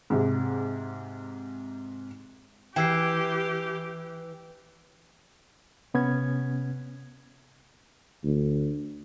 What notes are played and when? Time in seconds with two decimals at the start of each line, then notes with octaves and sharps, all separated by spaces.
0.10 G#2 C3
2.76 E3 G4 G5 E6 C7
5.94 C3 B3 C#4 G#6
8.24 D2